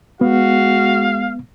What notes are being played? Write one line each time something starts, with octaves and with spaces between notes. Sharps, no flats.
G#3 B3 F#4 F5